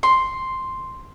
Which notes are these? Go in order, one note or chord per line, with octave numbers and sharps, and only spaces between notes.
C6